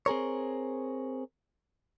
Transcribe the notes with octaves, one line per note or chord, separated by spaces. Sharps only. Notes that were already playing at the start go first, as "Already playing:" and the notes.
C4 G#4 A#4 C#5